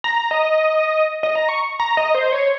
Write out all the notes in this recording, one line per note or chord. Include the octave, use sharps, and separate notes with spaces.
A#5
D#5
D#5
A#5
C#6
A#5
D#5
C5
C#5